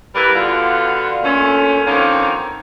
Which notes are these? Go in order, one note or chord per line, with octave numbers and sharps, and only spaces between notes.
G3 E4 A#4 B4
B2 D3 F4
A#2 D3 A3 C#4
D3 D#3 F3 A#3 C4 C#4